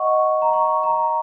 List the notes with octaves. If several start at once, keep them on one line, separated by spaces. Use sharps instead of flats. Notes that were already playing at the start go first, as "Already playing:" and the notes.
Already playing: D#5 F#5 C#6
A#5
C#6
A#5